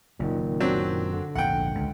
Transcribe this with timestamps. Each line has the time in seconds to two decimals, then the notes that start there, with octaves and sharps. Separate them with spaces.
0.20 F#1 F#2 A#2 D#3
0.60 F#3 C4 D4
1.13 D3
1.35 A#1 E2 G#2 F#5 G5
1.75 C#2